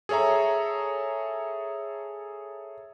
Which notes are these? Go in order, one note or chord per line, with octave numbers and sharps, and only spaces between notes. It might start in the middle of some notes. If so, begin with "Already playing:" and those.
G#4 A4 C#5 E5 A#5